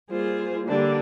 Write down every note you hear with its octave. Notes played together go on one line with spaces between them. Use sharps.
G3 A#3 F4 G#4 C5
D3 G3 A#3 D4